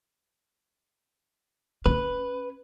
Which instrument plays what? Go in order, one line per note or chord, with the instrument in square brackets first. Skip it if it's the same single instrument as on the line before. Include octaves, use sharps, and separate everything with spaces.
[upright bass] C#4 [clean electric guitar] B4